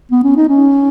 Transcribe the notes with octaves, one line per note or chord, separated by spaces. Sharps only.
B3
C#4
D#4
C#4